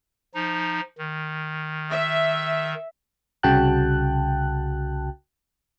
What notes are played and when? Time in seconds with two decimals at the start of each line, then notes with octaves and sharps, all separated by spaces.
0.35 F3 D#4
0.98 D#3
1.90 E5
3.43 C2 C#3 F#4 G5 A5 F#6